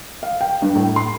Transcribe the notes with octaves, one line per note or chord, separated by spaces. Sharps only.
F5
G5
G2
A2
C6